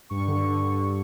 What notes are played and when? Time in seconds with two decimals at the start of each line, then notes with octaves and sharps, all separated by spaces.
0.10 G2 C#6
0.27 D3
0.45 D3
0.62 D3